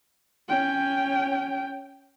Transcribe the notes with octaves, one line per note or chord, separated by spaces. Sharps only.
C#4 G5